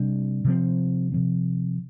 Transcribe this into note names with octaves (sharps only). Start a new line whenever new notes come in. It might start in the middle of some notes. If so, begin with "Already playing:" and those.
Already playing: C3 G3 D4
C3 F3 C4
C3 F3 C4